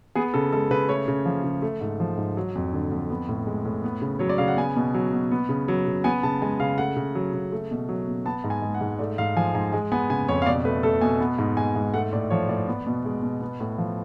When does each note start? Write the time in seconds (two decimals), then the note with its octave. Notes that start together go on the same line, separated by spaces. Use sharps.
0.15 B3 G#4
0.34 C#3 A4
0.52 G#3 A4
0.71 C#3 B4
0.89 A3 C#5
1.08 C#3
1.26 F3
1.44 C#3
1.62 A3
1.81 G#2
2.00 F3
2.18 G#2
2.37 F#3
2.55 F2
2.73 D3
2.92 F2
3.10 B3
3.29 A2
3.47 G#3
3.65 A2
3.84 B3
4.02 C#3
4.19 F#3 C#5
4.29 D5
4.38 C#3 F5
4.48 F#5
4.57 B3 G#5
4.76 B2
4.94 F#3
5.12 B2
5.31 B3
5.49 C#3
5.68 F#3
5.87 C#3
6.04 B3 G#5
6.23 C#3 A5
6.42 G#3 G#5
6.60 C#3 F5
6.78 A3 F#5
6.97 C#3
7.15 F#3
7.34 C#3
7.52 A3
7.71 B2
7.89 F#3
8.07 B2
8.25 B3 A5
8.44 G#2
8.50 G#5
8.62 G#3
8.74 F#5
8.81 G#2
8.99 A3 D5
9.18 G#2 F5
9.36 F3 G#5
9.55 G#2 G#5
9.73 G#3 G#5
9.92 B3 G#5
10.10 C#3 G#5
10.28 F2 C#5
10.42 F5
10.46 B2 D5
10.65 A3 B4
10.83 A3 A4
11.01 B2 G#5
11.21 B3
11.38 G#2
11.57 G#3 G#5
11.76 G#2
11.94 A3 F#5
12.13 A2 D5
12.30 F3 C#5
12.49 A2 D5
12.68 B3
12.86 B2
13.05 G#3
13.23 B2
13.42 B3
13.60 A2
13.78 F3